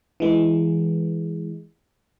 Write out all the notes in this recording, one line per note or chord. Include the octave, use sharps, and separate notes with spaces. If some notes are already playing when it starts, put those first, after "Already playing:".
E3 G#3